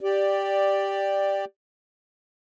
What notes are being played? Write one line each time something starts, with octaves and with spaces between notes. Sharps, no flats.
G4 D5